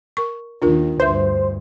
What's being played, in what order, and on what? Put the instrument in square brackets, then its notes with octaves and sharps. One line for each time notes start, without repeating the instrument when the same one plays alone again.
[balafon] A#4 C#6
[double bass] D#2 D#3 [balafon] D4 F4 A#4
[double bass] D2 G2 [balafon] B4 E5 [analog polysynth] C5